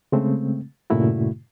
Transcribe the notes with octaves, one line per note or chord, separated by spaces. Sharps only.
C#3 G#3 A3 C4
G2 A#2 C#3 A3 E4 F#4